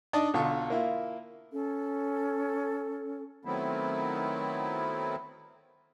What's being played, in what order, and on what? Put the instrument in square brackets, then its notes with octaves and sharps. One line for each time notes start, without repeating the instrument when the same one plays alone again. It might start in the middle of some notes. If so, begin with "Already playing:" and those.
[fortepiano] D4 D#4 D5 D#5 A5
B1 D3 F4 A4 C#6
A#3 E4 F4
[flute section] C#4 A4
[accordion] D#3 F#3 A3 B3 C4 E4